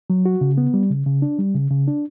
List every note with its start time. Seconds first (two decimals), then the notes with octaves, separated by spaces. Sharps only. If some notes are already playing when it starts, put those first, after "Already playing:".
0.10 F#3
0.25 F#4
0.41 C#3
0.58 B3
0.74 G3
0.90 C#3
1.06 C#3
1.22 D4
1.38 G3
1.55 C#3
1.71 C#3
1.87 D4